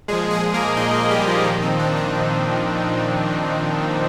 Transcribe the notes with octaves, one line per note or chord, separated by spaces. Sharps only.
A#2 F3 G#3 G#4
G#3 G#4
A#3 A#4
A#2 F3 D#4 D#5
G#3 G#4
G3 G4
F3 F4
A#2 D#3 F3 D#4
C4
D4
D4
A#2 F3